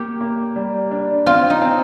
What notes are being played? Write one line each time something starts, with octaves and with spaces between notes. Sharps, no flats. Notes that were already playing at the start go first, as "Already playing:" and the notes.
Already playing: A#3 G4
A#3
G3
D4
C4 F4
D#4
C4